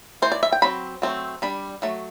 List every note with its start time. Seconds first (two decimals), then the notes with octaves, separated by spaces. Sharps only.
0.22 E3 A3 C5
0.32 D5
0.43 E5
0.52 G5
0.62 F#3 C4 B5
1.02 F#3 A3 C4
1.42 G3 D4 B5
1.82 F#3 A3